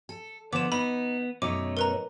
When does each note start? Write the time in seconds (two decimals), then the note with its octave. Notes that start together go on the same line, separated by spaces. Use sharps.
0.09 A4
0.53 D3 F3 B3 D6 E7
0.72 B3 D#4 B5
1.42 F#2 B2 A3 D#4 C#5 D6
1.77 A#4 B4 A#5